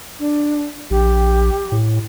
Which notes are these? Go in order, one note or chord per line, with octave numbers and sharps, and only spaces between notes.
D4
A#1 G4
A2